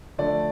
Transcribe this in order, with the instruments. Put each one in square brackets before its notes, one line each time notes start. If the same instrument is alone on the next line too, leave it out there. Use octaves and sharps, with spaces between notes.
[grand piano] D3 F3 A3 D5